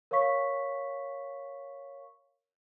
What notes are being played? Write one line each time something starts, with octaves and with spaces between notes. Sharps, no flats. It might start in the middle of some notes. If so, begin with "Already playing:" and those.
A#4 C#5 F5 C#6 B6